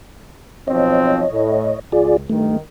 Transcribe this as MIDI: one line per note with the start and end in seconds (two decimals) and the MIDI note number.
0.68 1.25 35
0.68 1.25 53
0.68 1.25 60
0.68 1.80 73
0.68 1.80 75
1.32 1.75 45
1.92 2.24 37
1.92 2.17 65
1.92 2.17 68
1.92 2.17 74
2.30 2.57 43
2.30 2.57 51
2.30 2.57 57